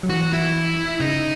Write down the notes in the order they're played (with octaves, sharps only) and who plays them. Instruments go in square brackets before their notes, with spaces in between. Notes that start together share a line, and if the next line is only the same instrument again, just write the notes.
[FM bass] F#3
[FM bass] E3 [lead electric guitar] F#4
[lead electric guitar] E4
[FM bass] C#3 [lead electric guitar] D#4